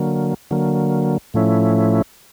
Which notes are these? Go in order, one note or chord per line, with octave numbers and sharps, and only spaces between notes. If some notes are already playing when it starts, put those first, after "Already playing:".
Already playing: D3 F#3 A#3
D3 F#3 A#3
A2 F3 A3 C#4 E4